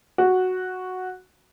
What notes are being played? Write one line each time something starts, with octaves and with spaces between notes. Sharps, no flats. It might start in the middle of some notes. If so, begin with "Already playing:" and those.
F#4